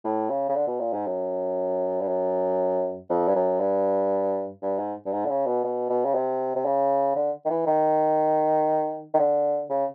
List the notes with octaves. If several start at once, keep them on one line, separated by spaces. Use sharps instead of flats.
A2
C#3
C#3
D3
B2
A#2
G#2
F#2
G2
F#2
F2
G2
F#2
G2
G2
G#2
G2
G#2
D3
C#3
B2
B2
B2
C#3
C3
C3
C#3
D3
D#3
E3
D#3
D#3
D3
C#3